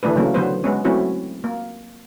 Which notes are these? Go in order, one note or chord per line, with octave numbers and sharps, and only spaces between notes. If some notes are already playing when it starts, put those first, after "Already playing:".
D3 E3 A3 D4 B4
C#3 E3 F#3 A3 A#3 C#4
D3 F#3 B3 B4 C5
G#3 B3 C#4
F#3 A3 C4 C#4 E4 F#4
A#3